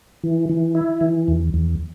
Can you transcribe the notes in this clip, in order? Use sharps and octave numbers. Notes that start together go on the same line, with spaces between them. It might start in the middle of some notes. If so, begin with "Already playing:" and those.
E3
E3
E4
E3
E2
E2